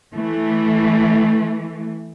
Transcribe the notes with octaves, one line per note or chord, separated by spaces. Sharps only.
E3 A3